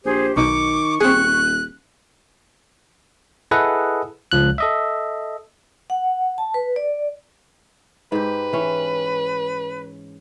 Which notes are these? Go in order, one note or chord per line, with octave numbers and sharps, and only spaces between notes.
A#1 G4 G#4 C5
B1 B2 D#3 D#4 C#6 D6
D#1 C4 G#4 F#6
E4 G#4 A4 B4 D#5 F#5
C#2 F3 F#6
A4 D#5 E5
F#5
A5
B4
D5
G#2 G4 B4
E3 C#4